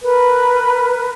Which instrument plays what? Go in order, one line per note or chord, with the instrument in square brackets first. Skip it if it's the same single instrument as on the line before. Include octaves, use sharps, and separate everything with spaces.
[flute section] A#4 B4